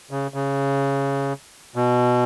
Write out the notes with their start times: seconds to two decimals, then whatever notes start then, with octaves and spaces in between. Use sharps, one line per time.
0.11 C#3
0.34 C#3
1.76 B2